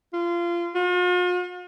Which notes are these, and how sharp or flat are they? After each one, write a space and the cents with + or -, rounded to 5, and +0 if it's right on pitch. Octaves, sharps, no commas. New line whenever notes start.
F4 -25
F4 +45